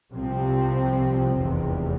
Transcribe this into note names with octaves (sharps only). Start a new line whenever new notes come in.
C2 C3 F3 C4
F1 E2 C3